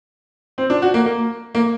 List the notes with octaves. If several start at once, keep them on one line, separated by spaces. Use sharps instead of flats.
C4
D4
F#4
A#3
A#3
A#3